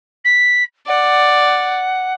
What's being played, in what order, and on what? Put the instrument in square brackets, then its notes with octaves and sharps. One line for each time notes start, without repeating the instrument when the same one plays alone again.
[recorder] B6
[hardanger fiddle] D5 [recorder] F#5